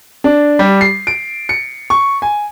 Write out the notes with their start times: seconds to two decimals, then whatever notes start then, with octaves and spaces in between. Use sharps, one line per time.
0.24 D4
0.59 G3
0.81 C7
1.07 D7
1.49 C#7
1.90 C#6
2.22 G#5